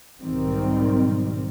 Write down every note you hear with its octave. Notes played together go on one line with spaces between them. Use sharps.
B1 G#2 D#3 G3 C4